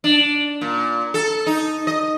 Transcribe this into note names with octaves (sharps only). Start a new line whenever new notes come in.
D4
A#2
A4
D#4
D#5